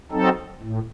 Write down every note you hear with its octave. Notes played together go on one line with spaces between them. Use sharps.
F#3 C4 D#4 A4
A2